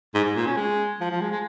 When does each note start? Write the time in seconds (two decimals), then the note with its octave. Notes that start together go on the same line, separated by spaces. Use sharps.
0.14 G#2
0.24 G#2
0.36 A#2
0.47 C#4
0.57 G#3
1.01 F3
1.11 F3
1.21 G#3
1.32 G#3